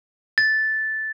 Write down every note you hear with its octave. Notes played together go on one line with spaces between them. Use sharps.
A6